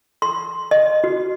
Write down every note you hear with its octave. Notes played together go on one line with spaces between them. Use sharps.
C6
D#5
F#4